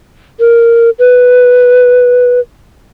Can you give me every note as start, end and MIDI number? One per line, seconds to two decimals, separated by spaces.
0.40 0.90 70
0.99 2.40 71